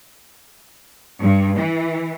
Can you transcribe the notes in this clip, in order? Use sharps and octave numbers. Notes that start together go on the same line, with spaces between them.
G2
E3